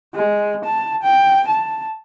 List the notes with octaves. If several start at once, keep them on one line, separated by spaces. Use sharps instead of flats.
G#3
A5
G5
A5